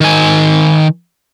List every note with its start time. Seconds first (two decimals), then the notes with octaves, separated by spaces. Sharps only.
0.01 D#3 G#5